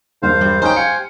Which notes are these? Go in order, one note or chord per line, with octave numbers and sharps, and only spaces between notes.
E1 G2 C5 F5
G3
C#4 D#4 C5 G5
F5 G#5 C#7